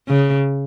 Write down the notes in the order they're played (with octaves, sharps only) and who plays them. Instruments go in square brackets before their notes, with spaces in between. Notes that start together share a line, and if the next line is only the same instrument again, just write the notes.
[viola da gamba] C#3